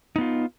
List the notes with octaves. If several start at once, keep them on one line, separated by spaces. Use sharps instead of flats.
B3 D#4 F4